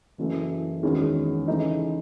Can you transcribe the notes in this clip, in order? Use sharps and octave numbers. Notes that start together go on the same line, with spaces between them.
F#1 F#2 E3 A3
E2 D#3 G#3 C#4 F#4
C#3 E3 A3 D#4